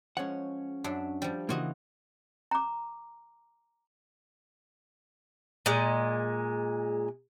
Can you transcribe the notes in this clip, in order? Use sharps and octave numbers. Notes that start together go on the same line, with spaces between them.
F3 G#3 C#4 C#5 F#5
F#2 D4 E5
F3 G3
C#3 E3 A#3 F4 F#4 D#5
A#5 D6
A#2 G#3